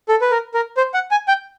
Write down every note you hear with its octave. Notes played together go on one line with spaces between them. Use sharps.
A4
B4
A#4
A#4
C5
F#5
G#5
G5